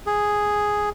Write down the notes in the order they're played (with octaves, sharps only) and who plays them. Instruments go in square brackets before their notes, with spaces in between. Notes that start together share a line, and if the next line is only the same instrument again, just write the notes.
[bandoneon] G#4